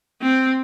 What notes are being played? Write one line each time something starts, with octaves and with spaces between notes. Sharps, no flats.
C4